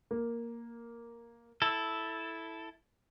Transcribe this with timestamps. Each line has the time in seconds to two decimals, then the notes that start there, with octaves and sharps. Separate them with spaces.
0.11 A#3
1.62 E4 A4